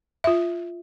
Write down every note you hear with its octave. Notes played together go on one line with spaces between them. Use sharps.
F4 E5